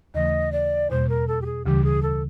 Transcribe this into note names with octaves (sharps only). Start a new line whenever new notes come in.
D#2 C#3 E3 A3 D#5
D5
E2 B2 G3 A#3 C5
A#4
A4
G4
G#4
D2 C#3 E3 G3 G4
G#4
A4